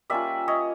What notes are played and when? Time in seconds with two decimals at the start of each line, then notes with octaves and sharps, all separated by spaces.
0.10 G3 A#3 C#4 F4 D5 E5
0.48 C#5 D#5